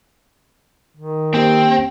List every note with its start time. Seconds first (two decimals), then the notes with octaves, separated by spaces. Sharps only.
0.97 D#3
1.34 A#3 C4 G4 C5 G5